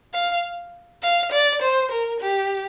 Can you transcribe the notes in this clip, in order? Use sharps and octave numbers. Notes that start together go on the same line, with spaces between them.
F5
F5
D5
C5
A#4
G4